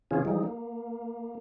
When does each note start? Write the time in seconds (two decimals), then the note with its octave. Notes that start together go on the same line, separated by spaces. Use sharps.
0.11 C3 E3 C#4 F4 G#4
0.25 E3 F3 G3 G#3 D#4
0.44 A#3